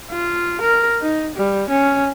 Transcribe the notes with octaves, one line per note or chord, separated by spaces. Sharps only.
F4
A#4
D#4
G3
C#4